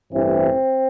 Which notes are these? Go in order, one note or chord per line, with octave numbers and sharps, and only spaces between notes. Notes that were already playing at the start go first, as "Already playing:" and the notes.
A1 G2 E3 C4